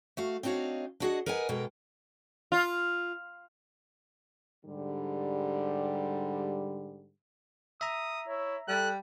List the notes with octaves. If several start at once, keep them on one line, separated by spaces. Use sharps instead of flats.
A3 F#4 F5
C4 D4 D#4 F#4 C#5 F5
D4 E4 F#4 G#4 D#5 F#5
A#4 B4 D#5 F#5 G#5
B2 G#3 A4 A#4 G5
F4
G#2 D3 G3
E5 A#5 D#6
E4 C#5
G3 A4 F#6